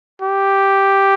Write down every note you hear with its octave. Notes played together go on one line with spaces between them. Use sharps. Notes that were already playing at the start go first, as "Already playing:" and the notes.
G4